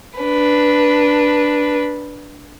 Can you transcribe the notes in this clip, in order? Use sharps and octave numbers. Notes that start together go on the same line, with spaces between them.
D4 B4